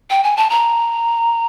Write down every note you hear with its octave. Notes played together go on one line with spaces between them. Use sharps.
G5
G#5
A5
A#5